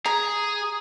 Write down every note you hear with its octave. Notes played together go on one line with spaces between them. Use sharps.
G#4 A#5